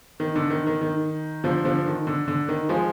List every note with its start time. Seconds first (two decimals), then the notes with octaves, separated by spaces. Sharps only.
0.20 D#3
0.35 D3
0.50 D#3
0.67 D#3
0.81 D#3
1.44 D3 F3
1.65 D3 F3
1.86 D#3
2.07 D3
2.28 D3
2.49 D#3
2.69 F3 G#3